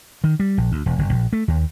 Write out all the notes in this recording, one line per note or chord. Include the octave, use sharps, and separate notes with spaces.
D#3
G3
A#1
D2
E1
F#1
A#1
A3
D#2